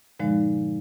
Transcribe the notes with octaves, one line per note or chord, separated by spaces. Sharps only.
G2 A#2 D3 F3 G#3 D#4